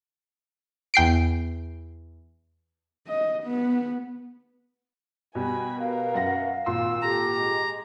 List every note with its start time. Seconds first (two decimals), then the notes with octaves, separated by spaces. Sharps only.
0.94 E2 G5 C7 D7
3.08 D#5
3.44 B3
5.35 B2 G3 G#5 B5
5.79 A#4 B4 F5
6.14 F#2 F#5 A#6
6.66 G#1 A#2 C6 E6
7.02 G4 A4 A#5
7.39 G#3